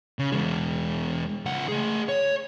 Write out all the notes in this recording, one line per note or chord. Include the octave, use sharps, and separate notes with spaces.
C#3
E2 G#3
C#2 F#5
A3 G#4
C#5